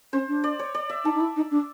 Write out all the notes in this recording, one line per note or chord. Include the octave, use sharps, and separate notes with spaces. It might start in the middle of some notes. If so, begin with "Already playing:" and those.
C#4 C5
D4
D5
C#5
D5
E5
D#4 A5
D#4
E4
D#4
D4